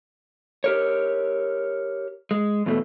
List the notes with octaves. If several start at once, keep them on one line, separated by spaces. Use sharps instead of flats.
G4 A#4 C#5
G#3
E2 B2 A3